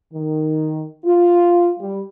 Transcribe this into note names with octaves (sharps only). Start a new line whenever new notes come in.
D#3
F4
G3